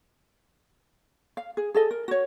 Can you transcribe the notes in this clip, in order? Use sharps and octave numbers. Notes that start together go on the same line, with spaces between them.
F5
G#4
G#4 A4 D#5
A#4
F#4 C#5